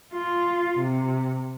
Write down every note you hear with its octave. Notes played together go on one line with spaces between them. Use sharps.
F4
C3